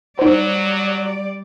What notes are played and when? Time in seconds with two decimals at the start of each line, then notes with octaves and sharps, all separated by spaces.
0.19 F#3 G3 D#4 C5 D5